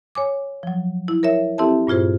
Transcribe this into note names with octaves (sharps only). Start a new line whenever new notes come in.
C#5 G#5 D6
F3 F#3
E4
A#4 C#5 E5
C4 E4 G4 A4 E5 A5
G2 A#2 F4 G#4 C5